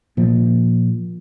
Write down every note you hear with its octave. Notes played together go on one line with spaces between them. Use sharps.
A#2 F3 A#3